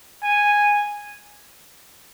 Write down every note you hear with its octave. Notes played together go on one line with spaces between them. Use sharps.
G#5